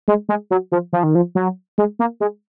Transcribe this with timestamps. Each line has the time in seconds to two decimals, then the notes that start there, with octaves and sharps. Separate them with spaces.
0.08 G#3
0.29 G#3
0.51 F#3
0.72 F3
0.93 F3
1.03 D#3
1.15 F3
1.35 F#3
1.78 G#3
1.99 A#3
2.20 G#3